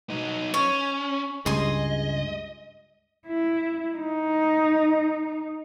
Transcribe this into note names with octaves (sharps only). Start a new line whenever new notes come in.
F#3 D#4
C#4 C#5
C#2 G2 G#4 D#5 C6
E4
D#4